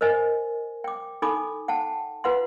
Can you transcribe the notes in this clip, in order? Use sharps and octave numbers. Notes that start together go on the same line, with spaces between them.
A#4 C5 D#5 G#5
G5 D6
D#4 A4 G#5 B5 D6
F#5 G5 A5
F4 B4 F#5 C6